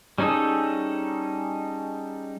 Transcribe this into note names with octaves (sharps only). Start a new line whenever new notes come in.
G3 C#4 D#4 G#4 A4